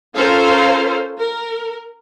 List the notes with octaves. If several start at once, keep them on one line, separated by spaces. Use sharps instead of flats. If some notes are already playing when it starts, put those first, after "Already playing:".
C#4 F4 A4 A#4 C5 F5
A#4